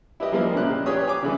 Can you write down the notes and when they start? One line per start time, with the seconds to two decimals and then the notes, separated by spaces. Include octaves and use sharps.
0.20 E4 G4 B4 D#5
0.32 F3 G3 G#3 A#3 E4
0.54 A#2 C#3 E4 G4 F#6
0.86 G4 G#4 B4 C#5 D5 D#6
1.07 G#5 D6
1.23 C#3 E3 G#3